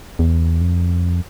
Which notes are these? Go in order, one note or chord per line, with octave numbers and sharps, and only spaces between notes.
E2
F2